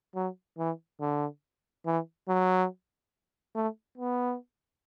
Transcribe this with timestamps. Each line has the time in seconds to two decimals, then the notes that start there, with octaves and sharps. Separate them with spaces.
0.15 F#3
0.58 E3
1.00 D3
1.86 E3
2.28 F#3
3.55 A3
3.98 B3